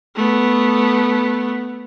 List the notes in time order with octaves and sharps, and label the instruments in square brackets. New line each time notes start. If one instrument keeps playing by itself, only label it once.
[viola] A3 B3